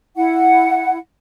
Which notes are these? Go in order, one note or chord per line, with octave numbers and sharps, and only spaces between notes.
E4 F#5